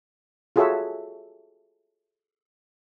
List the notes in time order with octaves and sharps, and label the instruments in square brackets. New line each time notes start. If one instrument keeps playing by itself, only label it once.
[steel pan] F4 F#4 G#4 A4 C#5 E5